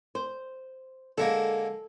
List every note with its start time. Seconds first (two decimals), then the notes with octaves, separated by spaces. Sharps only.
0.15 C5
1.18 D3 G#3 A#3 A4